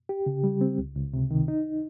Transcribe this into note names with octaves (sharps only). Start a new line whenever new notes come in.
G4
C#3
G3
C4
C#2
C#2
C3
D#3
D#4